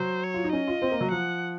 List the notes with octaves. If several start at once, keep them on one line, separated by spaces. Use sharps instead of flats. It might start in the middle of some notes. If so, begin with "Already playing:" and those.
Already playing: F#3 C5
C#5
F4
D#4
C#4 D#5
F4
C4
A#3
F#3
F3 F#5